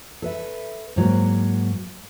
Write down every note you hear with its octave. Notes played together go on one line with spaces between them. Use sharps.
A4 B4 E5
G#2 F#3 G#3 A#3